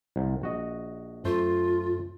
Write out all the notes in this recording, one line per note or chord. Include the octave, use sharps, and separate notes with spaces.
C2
A#1 F#4 D#5
F#2 A3 F4 C5